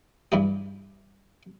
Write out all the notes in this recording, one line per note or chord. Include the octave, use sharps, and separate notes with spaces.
G2 E3 G4